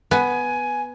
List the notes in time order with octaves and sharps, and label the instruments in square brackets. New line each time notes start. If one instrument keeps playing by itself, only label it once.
[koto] B3 [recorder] G#5